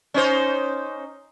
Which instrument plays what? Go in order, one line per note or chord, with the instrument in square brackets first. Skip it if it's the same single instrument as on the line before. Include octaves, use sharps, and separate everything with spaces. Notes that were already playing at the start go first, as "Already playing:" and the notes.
[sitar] C#4 D#4 C5